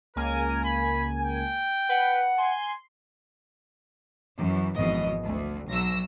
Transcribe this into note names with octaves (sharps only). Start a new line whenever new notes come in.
C#2 A#3 A#4 G#5
B5
G5
B4 F#5
G#5 C6
F#2 E3
G#1 F2 B2 E3 D#5
D2
B1 B2 F#3 E6 A#6